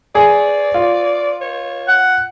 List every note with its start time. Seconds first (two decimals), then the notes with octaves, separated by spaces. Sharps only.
0.15 G#4 D5
0.74 F4
1.41 C#5
1.88 F#5